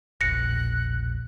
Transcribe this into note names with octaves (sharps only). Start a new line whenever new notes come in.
E1 A#1 F#6 A#6 C#7